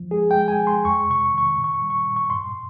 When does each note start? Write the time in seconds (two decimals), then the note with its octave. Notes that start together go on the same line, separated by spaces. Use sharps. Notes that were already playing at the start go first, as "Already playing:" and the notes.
Already playing: F3
0.11 G#3 G#4
0.31 G5
0.37 G#3
0.48 G#5
0.61 G#3
0.67 C6
0.85 F2 C#6
1.09 C3 C#6
1.34 D#3 C#6
1.57 A#2
1.64 C#6
1.82 G3
1.90 C#6
2.07 A#2
2.16 C#6
2.30 G2 C6